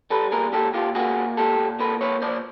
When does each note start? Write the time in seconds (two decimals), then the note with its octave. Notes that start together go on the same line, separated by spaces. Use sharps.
0.10 G3 A4 B4
0.32 A#2 G#4 A#4
0.53 A#2 G4 A4
0.74 A#2 F4 G4
0.95 A#3 F#4 G#4
1.16 A#2
1.37 A#2 G4 A4
1.59 A#2
1.79 A#3 A4 B4
2.01 A#2 B4 C#5
2.22 A#2 C5 D5